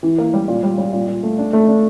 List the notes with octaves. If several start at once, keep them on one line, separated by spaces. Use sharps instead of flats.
E3
A#3
G3
A#2
G3
G3
A#2
A#2
A3
D4
A3
D4